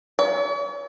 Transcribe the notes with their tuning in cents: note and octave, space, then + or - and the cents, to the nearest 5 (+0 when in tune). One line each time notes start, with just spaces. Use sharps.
C#5 +45